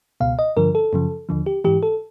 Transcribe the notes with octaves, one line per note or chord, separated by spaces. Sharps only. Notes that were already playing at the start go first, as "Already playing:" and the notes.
C#2 B2 F5
D#5
G2 D3 F3 A#4
A4
F#2 C#3 F3
D#2 D3 F3
G4
G#2 E3 G4
A4